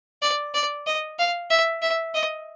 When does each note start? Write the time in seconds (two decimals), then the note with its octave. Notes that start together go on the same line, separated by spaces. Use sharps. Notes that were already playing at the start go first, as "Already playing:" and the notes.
0.22 D5
0.54 D5
0.86 D#5
1.19 F5
1.50 E5
1.82 E5
2.14 D#5